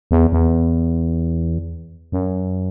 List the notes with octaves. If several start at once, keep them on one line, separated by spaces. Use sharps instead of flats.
E2
E2
F#2